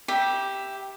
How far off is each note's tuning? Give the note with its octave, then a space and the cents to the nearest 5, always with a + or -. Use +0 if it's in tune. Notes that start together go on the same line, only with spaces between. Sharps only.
G4 +0 E5 +0 B5 -35